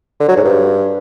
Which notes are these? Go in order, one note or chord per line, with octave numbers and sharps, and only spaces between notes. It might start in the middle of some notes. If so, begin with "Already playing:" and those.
D3
F#3
G#2
G2